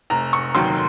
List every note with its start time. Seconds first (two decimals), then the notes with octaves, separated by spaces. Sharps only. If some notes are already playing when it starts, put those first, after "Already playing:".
0.10 F1 A#5
0.33 C#6
0.55 D#2 D#3 F#3 C6